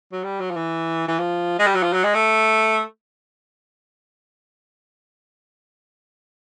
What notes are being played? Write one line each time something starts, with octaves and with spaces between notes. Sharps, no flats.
F#3
G3
F#3
F3
E3
E3
F3
G#3
G3
F#3
F3
F#3
G#3
A3